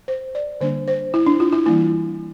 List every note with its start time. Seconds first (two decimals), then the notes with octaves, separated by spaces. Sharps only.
0.08 C5
0.35 D5
0.61 D3 G3 A#3 D4 C5
0.88 C5
1.14 E4
1.27 D4
1.40 F4
1.53 E4
1.66 E3 G3 A#3 E4